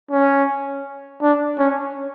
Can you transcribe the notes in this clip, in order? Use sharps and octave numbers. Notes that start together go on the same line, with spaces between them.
C#4
D4
C#4